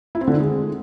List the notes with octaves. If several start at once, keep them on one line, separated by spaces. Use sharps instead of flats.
E4
C4
D3
D#3
G#3